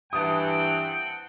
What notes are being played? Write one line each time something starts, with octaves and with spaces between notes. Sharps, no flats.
G2 E3 C4 F#5 G5 A5 D#6